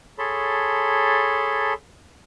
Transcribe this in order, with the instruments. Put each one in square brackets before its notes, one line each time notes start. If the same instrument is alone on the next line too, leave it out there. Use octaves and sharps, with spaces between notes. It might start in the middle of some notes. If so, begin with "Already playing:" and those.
[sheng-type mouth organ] G#4 A4 C#5 A5 B5 C6